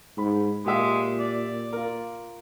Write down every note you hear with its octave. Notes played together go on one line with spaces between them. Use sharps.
G#2 B5
A#2 G#3 G4 E5 F5
D5
F4 A#4